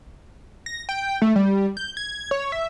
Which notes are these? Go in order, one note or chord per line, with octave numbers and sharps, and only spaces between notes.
A#6
G5
A3
G3
G6
G#6
C#5
E5